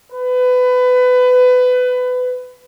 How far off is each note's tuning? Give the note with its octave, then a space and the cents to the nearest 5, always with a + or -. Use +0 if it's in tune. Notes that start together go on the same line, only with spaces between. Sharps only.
B4 +25